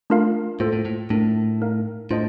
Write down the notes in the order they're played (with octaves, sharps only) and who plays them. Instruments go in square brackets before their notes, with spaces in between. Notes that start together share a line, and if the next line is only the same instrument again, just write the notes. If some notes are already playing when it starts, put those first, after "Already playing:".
[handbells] A3 D4 F4 A#4 F5
[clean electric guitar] A2 [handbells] A#3 F4 A4 C5
[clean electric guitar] A2
A2
[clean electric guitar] A2 [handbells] A3 D4 F4 A#4
[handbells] A3 D#4 A#4 F5
[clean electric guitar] A2 [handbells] D4 F4 C5 D#5 A5